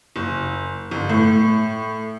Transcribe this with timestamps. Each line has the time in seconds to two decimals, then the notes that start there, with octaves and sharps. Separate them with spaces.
0.16 F#1
0.91 G1
1.09 A2